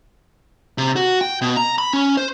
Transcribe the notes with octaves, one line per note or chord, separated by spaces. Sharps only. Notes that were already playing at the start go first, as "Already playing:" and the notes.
C3
F#4
G5
B2
A#5
B5
C#4
C5